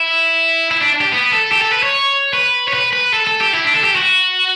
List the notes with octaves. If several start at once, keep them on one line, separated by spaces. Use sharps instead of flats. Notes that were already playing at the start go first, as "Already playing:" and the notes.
Already playing: E4
E4
D4
G4
B3
A4
G4
A4
B4
C#5
B4
C#5
B4
B4
A4
A4
G4
E4
D4
A4
G4
F#4